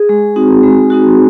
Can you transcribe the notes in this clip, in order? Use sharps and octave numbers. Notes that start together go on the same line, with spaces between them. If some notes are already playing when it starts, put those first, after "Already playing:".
Already playing: G#4
G#3
C4 D#4 F#4
G#3
C4 D#4 F#4